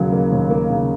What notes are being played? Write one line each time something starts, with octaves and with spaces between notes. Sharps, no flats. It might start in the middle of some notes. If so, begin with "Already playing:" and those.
Already playing: D#2 C#3 F#3 A#3
A#3
D#2
A#3
C#3